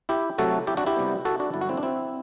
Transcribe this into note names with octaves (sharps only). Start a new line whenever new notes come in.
E4 G4
C3 F#3 A3 F#4 A4
E4 G4
D4 F#4
E4 G4
C3 G3 B3
F#4 A4
D4 F#4
G2 D3 F#3 B3 E4
F#4
C4 E4
D4
C4 E4